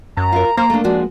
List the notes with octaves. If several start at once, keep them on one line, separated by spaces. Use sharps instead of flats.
F#2 A#5
F4 A#4
A#3 C5 A#5
A3 D4
F3 G#3 D4 F#4